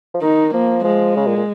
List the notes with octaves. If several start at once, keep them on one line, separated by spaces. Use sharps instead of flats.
F3
D#3 D#4
F3 A#3
F3 G#3
C#3
A#2
A#2